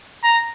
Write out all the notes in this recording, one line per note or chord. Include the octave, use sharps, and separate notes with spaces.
A#5